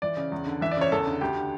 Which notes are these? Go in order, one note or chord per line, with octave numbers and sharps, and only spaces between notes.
E3 D5
C#3
E2
D3
E3 E5
D5
C#3 C#5
E2 A4
D3
D2 G4
D3